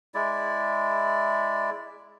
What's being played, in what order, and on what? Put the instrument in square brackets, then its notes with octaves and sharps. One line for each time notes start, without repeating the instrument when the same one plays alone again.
[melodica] G#3 E4 D5